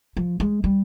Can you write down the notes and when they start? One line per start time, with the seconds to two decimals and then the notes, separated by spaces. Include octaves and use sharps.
0.17 F3
0.40 G#3
0.64 G3